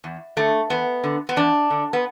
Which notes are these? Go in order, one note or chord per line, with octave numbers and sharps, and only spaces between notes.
E2
D3 A3
E2 B3
D3
B3
E2 D4
D3
B3